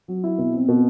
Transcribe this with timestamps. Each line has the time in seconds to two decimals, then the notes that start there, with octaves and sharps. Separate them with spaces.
0.08 F#3
0.24 E4
0.38 B2
0.53 C4
0.68 B2